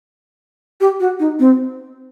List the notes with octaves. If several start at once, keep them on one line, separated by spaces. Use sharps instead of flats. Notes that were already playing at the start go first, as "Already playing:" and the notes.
G4
F#4
D#4
C4